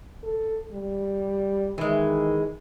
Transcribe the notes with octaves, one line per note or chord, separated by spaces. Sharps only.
A4
G3
D#3 E3 G#3